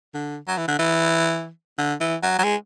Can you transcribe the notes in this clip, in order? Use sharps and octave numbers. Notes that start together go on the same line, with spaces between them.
D3
F#3
E3
D3
E3
D3
E3
F#3
F#3
G#3